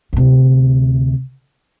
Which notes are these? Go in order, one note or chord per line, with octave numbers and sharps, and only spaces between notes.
D2 C3